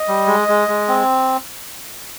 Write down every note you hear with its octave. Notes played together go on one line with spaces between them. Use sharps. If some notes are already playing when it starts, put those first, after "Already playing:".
Already playing: D#5
G3
G#3
G#3
G#3
C4